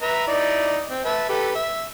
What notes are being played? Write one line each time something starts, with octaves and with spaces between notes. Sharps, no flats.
B4 E5 A#5
D#4 E4 D5
C4
B4 E5 A5
G4 A4 B4
E5